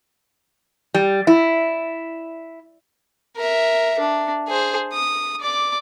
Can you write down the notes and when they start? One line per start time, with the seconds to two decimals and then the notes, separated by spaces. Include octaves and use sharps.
0.94 G3
1.27 E4
3.36 A#4 E5
3.99 D4
4.48 G#4 C5
4.93 D#6
5.40 D5 D6